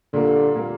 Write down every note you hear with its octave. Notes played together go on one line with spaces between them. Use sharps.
A#2 D3 G3 A#3
A#2 G3 A#3